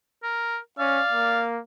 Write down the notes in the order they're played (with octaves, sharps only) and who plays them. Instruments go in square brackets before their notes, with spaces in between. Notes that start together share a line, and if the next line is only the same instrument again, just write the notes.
[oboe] A#4
[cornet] C#4 [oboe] D5 [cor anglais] F5
[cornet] A#3